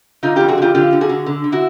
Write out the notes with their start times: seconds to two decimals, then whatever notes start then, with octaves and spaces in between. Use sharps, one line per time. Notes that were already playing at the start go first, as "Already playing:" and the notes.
0.23 D3 D#4 F4
0.36 F2 F4 G4
0.48 F#4 G#4
0.58 D3 F4 G4
0.75 D3 F4 G4
0.93 D3
1.01 F#4 G#4
1.09 D3
1.26 D3
1.44 D3
1.52 E4 F#4